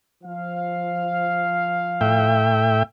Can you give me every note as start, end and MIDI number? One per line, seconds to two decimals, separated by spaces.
0.24 2.46 53
0.24 2.46 77
2.01 2.83 45
2.01 2.83 76
2.01 2.83 79